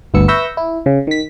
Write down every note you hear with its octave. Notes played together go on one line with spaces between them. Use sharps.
G1 D2 B3 E6 C#7
B4 E5 C#6 E6 G6 A#6
E4
C#3
D#3 B6